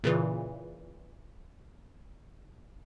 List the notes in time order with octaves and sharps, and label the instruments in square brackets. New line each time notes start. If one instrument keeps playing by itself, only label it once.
[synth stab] A#2 C#3 E3